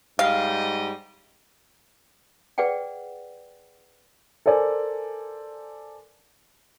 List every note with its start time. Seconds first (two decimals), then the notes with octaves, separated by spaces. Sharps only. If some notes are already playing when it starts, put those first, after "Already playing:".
0.19 G#2 G3 D#5 F5
2.58 G#4 B4 D5 F#5 G5
4.46 A4 A#4 C5 D5 G#5